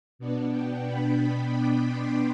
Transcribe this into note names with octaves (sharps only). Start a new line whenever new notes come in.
B2 B3 D4
G5
B5
D6
C6